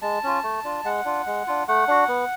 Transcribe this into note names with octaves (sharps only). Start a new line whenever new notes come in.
G#3 A5
C#4 F4
A3
D4 F4
G#3 F#5
D4 F4
G#3
D4 F4
A3 F#5
D4 F#4
B3